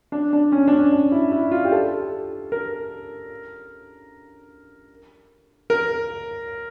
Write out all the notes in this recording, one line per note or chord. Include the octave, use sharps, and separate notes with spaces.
D4
D4
C#4
D4
C#4
D4
E4
E4
F4
G4
A4
A#4
A#4